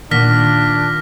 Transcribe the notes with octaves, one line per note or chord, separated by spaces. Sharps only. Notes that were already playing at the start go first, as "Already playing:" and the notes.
A#2 D#3 D4 F#5 C#6 F6 A#6 B6